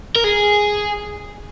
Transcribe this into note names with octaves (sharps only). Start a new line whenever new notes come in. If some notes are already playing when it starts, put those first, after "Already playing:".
A#4
G#4